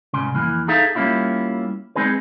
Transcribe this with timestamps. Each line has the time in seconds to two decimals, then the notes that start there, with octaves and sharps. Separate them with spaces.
0.13 C2 G#2 C#3 C6
0.35 F2 E3 A#3
0.68 D#4 G#4 A4 E5 F5
0.95 G3 A#3 C4 C#4 E4 F4
1.96 G#3 C4 D#4 G#4 B4